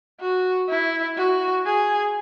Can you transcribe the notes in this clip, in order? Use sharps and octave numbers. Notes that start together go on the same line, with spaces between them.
F#4
E4
F#4
G#4